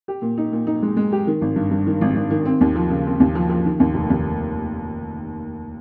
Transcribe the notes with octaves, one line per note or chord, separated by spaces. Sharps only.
G4
A#2
D#4
A#2
D#4
G#3
G#3
G4
D#3
G#1
G2
G2
D#3
G#1
G#1
D#3
C4
D#2
F3
C#3
C4
D#2
F3
F3
D#3
D#2
F1
D#2